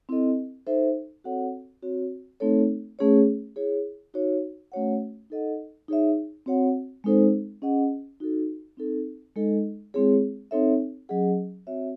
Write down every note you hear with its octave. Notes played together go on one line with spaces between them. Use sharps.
C4 E4 A4 D#5
D#4 A4 C5 E5
C4 F#4 A4 C#5 F#5
C4 F#4 C#5
A3 C4 D#4 A4 C#5
A3 C#4 G#4 C#5
E4 G#4 C#5
D#4 F#4 C#5
A3 C#4 F#4 C#5 F#5
D#4 A4 D#5 F#5
D#4 G#4 C#5 E5
C4 F#4 C#5 F#5
G#3 C4 D#4 A4 C5
C#4 G#4 D#5 F#5
D#4 F#4 A4
C4 D#4 A4
G#3 D#4 A4 D#5
G#3 C4 E4 G#4 C#5
C4 D#4 A4 C#5 E5
F#3 C#4 G#4 D#5 F#5
C4 F#4 C#5 E5